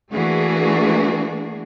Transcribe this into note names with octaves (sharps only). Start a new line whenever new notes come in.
E3 A3 A#3 D4 F#4 G#4